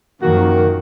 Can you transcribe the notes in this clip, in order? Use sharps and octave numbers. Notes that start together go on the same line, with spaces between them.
F#2 D#3 F3 A#3 F#4